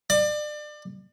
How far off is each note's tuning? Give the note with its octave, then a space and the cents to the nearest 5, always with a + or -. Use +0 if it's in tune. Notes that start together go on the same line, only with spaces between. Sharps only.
D5 +30